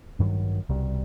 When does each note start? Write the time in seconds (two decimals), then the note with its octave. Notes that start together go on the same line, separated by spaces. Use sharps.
0.19 A1 G2 D#3 F#3
0.69 C2 B2 G3